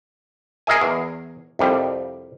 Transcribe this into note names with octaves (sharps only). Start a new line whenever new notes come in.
G#4 A#4 D#5 E5 G#5
E2
C2 F2 G3